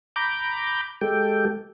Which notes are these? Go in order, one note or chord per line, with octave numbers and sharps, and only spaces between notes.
A#5 B5 D6 G6
G#3 G4 A4 G5